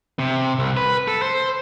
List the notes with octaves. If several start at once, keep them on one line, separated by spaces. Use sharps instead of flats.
C3
C2
B4
A4
C5